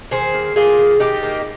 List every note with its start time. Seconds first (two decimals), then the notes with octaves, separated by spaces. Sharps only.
0.11 D#3 G#4 C5
0.34 A#3
0.56 A#3 F4 G#4
0.78 D#3
1.00 D#3 D#4 G4
1.23 A#3